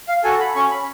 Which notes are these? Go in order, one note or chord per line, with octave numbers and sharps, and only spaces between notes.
F5
F#4 A4 G#5
B5
C#4 C#6
B5